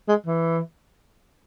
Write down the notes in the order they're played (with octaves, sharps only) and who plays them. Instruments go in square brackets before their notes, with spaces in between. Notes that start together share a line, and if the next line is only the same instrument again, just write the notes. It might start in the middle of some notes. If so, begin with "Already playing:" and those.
[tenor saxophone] G#3
E3